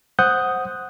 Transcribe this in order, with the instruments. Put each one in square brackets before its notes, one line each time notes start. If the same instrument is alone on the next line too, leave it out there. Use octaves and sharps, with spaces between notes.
[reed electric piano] C5 F#5 D#6 F#6 G6